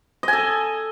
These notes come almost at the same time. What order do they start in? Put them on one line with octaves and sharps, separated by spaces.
D#5 G#5 A4